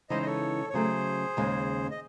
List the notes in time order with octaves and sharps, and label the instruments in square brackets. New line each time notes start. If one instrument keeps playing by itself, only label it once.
[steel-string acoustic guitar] C#3 E3 G#3 D#4 [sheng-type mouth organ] C5 D#5
[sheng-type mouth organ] D#5
A4 C#5
C#5
[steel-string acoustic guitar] C#3 F#3 A3 [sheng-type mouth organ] G#4 C5
[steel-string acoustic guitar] D#2 C#3 G#3
[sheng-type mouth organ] D#5